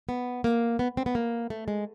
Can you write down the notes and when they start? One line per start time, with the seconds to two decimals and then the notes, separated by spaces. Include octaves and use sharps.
0.09 B3
0.44 A#3
0.79 B3
0.97 C4
1.06 B3
1.15 A#3
1.50 A3
1.68 G#3